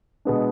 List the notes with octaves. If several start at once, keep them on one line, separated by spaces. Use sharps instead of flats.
B2 G#3 B3 D4